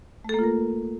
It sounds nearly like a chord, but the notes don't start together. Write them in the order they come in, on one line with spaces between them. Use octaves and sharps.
A3 A4 A#3 F4 A#4